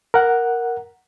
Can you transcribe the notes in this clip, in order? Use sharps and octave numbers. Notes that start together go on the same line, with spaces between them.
A#4 F#5